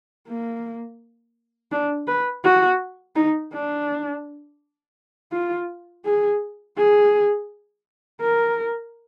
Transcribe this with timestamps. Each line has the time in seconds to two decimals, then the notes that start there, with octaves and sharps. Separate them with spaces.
0.28 A#3
1.72 D4
2.08 B4
2.44 F#4
3.16 D#4
3.53 D4
5.32 F4
6.05 G#4
6.77 G#4
8.21 A#4